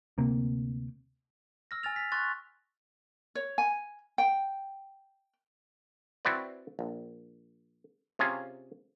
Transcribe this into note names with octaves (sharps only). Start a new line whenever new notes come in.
D2 C3 A#3 C4
E6 F6 A#6
G#5 F6 A6 F7
A6 B6
C6 C#6 F#6 A6
C#5
G#5
G5
C4 E4 F#4 B4 D5
A#1
C3 C#4 F4 G#4